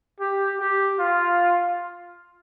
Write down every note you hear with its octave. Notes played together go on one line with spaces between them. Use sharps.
G4
G4
F4